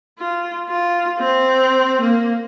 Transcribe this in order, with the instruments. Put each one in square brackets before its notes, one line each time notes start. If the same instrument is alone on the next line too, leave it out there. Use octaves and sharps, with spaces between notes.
[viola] F4
F4
C4
A#3